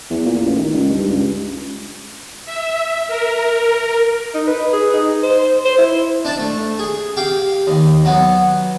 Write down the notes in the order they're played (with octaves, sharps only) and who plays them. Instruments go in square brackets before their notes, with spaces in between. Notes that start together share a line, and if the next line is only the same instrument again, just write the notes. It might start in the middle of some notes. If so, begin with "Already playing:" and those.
[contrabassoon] E2
A#2
A1
D#3
C#2
G2
C#2
[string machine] E5
A#4
[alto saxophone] D#4
B4
G#4
D#4
C5
C5
E4
[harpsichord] D4 D5 A5
A3
G#4
G4 F5 G5
D#2
F#3 B3